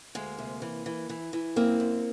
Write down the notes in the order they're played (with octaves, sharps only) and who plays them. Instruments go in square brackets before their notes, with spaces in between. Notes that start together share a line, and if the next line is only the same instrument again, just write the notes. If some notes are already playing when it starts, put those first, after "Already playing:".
[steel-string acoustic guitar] D2 G#3 A#3
C3
E3
E3
E3
E3
F#2 A#3 C4
F#2